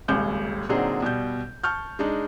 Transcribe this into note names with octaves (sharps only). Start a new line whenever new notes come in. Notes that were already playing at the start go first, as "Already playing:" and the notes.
D#1 G#1 C#2 G6
A#2 D3 F#3 C4 D#4 G#4
B2 G3 G6
A5 C#6 F6 G6
G#3 D4 D#4